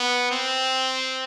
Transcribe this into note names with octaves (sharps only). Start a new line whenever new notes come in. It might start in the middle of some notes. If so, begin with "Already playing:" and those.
Already playing: B3
C4